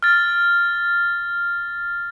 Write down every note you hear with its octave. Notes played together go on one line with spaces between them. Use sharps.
F6 A6